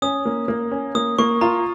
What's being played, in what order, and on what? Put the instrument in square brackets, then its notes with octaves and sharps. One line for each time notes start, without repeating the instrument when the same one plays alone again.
[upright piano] C#4 [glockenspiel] D#6
[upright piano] A#3
A#3
C#4
[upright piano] A#3 [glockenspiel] D#6
[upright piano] A#3 [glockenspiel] C#6
[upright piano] F4 [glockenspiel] A#5